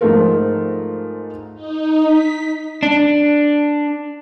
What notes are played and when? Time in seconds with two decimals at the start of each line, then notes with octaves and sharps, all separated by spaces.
0.01 G#2 F3 G#3 A3 F4 A#4
1.55 D#4
2.04 B6
2.83 D4